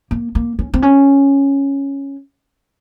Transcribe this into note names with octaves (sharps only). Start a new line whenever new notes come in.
A#3
A#3
C#4
C4
C#4